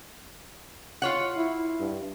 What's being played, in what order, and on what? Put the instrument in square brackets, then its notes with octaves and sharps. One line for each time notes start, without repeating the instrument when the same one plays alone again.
[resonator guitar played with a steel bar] F4 C#5 F#5
[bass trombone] E4
G2